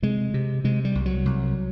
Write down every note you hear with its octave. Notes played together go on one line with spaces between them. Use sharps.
C3 G#3
C3
C3 G#3
G3
C2
F#3
C2